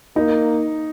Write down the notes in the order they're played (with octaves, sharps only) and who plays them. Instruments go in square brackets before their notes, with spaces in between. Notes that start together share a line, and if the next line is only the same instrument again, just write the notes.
[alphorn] A#3 [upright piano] D#4